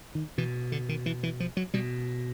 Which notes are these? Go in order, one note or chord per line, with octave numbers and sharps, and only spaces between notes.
D#3
B2 E3
D3
D#3
E3
E3
F3
F#3
B2 G3